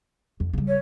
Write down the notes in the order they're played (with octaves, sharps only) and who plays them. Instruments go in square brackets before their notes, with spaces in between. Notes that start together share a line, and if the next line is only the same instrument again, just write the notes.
[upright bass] F2
C#3 G3
[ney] C#5